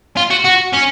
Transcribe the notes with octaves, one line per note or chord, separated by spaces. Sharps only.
F4
F#4
F#4
C#4